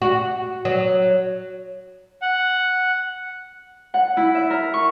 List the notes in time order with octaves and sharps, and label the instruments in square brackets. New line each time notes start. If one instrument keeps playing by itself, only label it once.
[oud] F#4
F#3
[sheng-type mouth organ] F#5
[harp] F#5
E4
E5
A#4
C#6